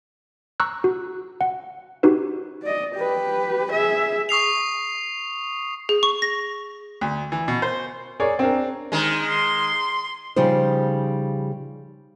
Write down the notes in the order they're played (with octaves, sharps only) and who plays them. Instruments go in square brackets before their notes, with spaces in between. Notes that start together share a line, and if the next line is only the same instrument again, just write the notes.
[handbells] A#5 C#6 E6 F#6
F#4
F#5
D#4 F#4 G4 B4
[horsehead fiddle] D5 D#5
G4 B4
G#4 E5
[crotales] C#6 D#6 C7 F7
[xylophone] G#4
C#6
A#6
[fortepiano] D2
E3
B2
C5
[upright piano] G#4 A#4 C#5 D5
C4 D4 A#4
[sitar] D#3 G#3
[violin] C6
[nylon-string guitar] C#3 F3 G3 D#4 C5